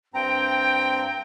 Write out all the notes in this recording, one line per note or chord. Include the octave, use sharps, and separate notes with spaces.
G2 C4 G5 A#5